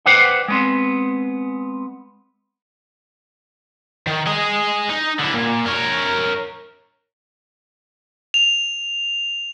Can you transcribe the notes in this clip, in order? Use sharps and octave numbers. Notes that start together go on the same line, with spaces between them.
B4 C5 D5 F#5 G5
G#3 B3 C4
D#3
G#4 D#5
D#4
D3 E4
A#2
A#4 C#5
F7